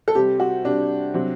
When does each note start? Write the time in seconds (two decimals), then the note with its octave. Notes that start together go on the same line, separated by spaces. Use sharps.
0.08 A4
0.15 C3 G3 G4
0.40 F#4
0.65 C3 G3 D4
1.14 C3 F#3